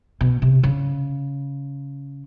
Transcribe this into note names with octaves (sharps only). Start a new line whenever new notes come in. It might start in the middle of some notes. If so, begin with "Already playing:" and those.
B2
C3
C#3